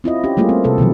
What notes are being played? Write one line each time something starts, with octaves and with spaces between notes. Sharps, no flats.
C4 E4 F4 D#5
C#4 G4
G3 A3 A#3 F4 G#4
C4
C3 A4 B4
B2 D#3 F3 F#3